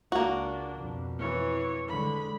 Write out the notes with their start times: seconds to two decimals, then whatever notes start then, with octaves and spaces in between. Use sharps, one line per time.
0.12 C#2 A#3 D4 F#4
0.75 F2 B2
1.18 E3 C#5
1.88 D3 G#3 B5